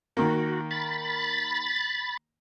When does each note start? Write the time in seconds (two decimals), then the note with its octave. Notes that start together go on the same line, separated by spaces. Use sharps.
0.17 D#3 A#3 F#4
0.71 B5 A6